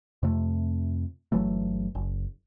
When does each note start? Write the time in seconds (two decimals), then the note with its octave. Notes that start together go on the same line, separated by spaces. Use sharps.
0.23 F2 C3 A3
1.32 G1 E3 F#3 A3
1.95 F#1